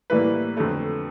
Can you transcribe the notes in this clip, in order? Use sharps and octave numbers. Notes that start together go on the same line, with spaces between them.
A2 E3 G3 A#3 B4
F2 D3 F#3 A3